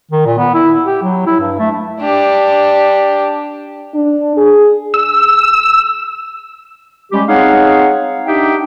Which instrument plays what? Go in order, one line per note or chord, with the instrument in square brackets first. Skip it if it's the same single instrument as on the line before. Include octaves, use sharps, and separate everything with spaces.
[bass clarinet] D#3
A#2
B3
E4
G4
F#3
E4
G2
A3
[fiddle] D4 G4
[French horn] D4
G#4
[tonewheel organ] E6
[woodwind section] G3 G#3 C#4 G4
C4 D#4 G#4 C#5 F5 F#5
D4 D#4 G4 E5 G5